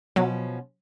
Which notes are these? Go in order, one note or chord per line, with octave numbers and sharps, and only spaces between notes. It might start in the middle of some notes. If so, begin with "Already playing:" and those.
B2 F3 F#3 C#4